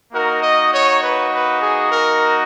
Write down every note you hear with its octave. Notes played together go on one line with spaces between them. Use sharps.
A#3 D#4 F#4 A#4
D#5
C#5
B4
B4
G#4
A#4